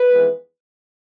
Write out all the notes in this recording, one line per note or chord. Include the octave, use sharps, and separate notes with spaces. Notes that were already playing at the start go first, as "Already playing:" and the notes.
Already playing: B4
F2 E3 G#3 B3